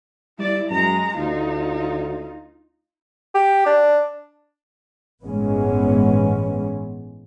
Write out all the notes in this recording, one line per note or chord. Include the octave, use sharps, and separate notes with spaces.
G3 E4 D5
F#2 G#3 A#5
D2 D#4 F4
G4
D4
G1 A2 E3 G#3 B3 C#4